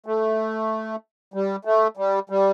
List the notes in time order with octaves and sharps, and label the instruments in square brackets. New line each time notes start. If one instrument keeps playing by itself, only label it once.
[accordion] A3
G3
A3
G3
G3